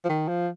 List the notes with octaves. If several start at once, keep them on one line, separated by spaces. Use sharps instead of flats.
F3
D#3
F3